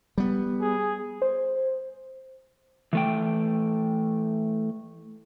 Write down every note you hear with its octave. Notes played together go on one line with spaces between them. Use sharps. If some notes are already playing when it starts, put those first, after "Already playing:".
G3 B3
G#4
C5
E3 A3 G5